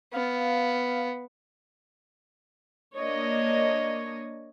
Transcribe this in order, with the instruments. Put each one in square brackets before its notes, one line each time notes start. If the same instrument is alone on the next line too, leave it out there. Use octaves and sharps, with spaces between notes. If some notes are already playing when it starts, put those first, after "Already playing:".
[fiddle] B3 [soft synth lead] F5
[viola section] A#3 D4 C#5 D#5